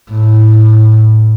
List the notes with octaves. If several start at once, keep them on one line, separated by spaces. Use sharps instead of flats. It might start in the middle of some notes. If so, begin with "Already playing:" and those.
A2